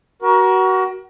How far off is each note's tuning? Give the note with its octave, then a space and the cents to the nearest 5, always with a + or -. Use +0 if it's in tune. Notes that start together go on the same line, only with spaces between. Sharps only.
F#4 +20 A#4 +30